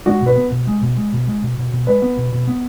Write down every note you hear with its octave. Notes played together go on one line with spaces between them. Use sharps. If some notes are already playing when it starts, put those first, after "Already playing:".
G#3 F#4
B2
B4
B3
B2
G#3
B2
G#3
B2
G#3
B2
B2
B2
G#3 B4
B3
B2
B2
B3